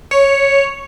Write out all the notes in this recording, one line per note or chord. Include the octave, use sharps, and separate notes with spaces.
C#5